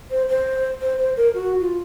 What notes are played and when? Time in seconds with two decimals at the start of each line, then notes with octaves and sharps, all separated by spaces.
0.11 C5
0.29 C5
0.81 C5
0.98 C5
1.17 A#4
1.34 F#4
1.60 F4